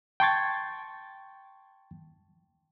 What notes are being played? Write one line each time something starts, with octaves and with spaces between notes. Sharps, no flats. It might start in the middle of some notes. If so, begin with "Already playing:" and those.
G5 A5 C6 C#6 G#6 A6